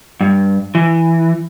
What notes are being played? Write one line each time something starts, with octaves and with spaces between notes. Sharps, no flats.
G2
E3